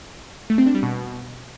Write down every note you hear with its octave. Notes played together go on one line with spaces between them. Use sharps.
A3
C4
D4
G3
B2